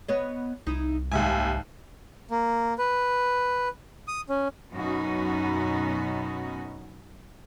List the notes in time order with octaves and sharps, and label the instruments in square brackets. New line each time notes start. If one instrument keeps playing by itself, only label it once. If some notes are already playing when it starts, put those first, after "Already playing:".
[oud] B3 C#5 D#5
[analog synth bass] C2 [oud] D#4 E4
[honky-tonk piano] D#2 E5 G#5 [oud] G#2
[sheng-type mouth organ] A#3
B4
D#6
C#4
[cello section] F#2 B2 B3 C#4 D#4 F#4